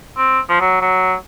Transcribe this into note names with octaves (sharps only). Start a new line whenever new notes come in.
C4
F3
F#3
F#3